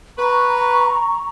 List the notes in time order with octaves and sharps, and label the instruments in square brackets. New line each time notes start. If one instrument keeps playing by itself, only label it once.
[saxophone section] B4 [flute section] A#5 C#6